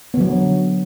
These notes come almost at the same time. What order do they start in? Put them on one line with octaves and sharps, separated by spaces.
B3 D3 F#3